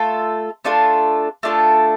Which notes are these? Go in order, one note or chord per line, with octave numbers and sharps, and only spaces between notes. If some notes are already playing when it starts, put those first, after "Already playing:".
Already playing: A3 F4 A4
A3 D4 F4 A4
A3 D4 F4 A4